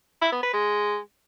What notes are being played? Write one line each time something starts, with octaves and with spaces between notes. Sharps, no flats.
E4
B3
B4
G#3